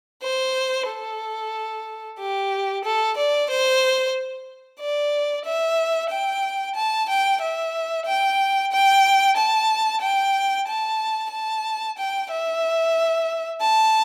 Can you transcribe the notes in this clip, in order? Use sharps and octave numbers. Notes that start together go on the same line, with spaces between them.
C5
A4
G4
A4
D5
C5
D5
E5
G5
A5
G5
E5
G5
G5
A5
G5
A5
A5
G5
E5
A5